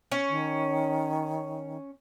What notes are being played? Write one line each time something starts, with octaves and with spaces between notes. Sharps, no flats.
C#4
D#3